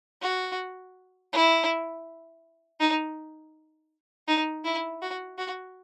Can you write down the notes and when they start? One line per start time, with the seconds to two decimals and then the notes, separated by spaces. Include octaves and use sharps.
0.21 F#4
1.33 E4
2.80 D#4
4.28 D#4
4.65 E4
5.01 F#4
5.38 F#4